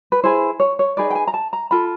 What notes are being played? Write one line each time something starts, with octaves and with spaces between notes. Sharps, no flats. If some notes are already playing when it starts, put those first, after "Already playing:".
B4
E4 G#4 B4 C5
C#5
C#5
D#4 G#4 B4 D5
G5
G#5
A#5
A5
A#5
F4 A4 B5